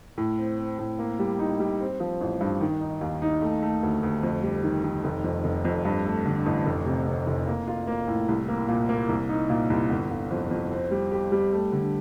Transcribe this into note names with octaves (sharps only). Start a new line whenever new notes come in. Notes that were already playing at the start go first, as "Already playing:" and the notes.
A2
C4
C4
A2
A#3
G3
D#4
G3
C4
F3
A1
G2
D#3
D#4
D#2
D#4
A3
A3
D2
D2
F2
G3
D#3
D#3
F1
F2
F1
F2
G2
A3
D3
A1
F1
C3
C3
F1
A#3
F4
A#3
A2
C2
A#3
A#2
A#3
C2
D#4
A#2
C2
G1
G1
F2
F2
C4
G3
G4
G3
A3
D3